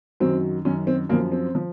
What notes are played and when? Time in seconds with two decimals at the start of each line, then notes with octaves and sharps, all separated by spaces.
0.20 F#2 D#3 F#3 C4
0.65 F#2 D#3 F#3 C#4
0.87 C4
1.09 F#2 A#3
1.13 F3
1.32 C4
1.55 F3